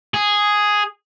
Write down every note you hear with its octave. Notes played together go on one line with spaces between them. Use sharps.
G#4